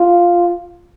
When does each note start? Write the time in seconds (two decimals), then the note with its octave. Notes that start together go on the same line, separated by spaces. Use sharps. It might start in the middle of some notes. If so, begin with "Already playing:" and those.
Already playing: F4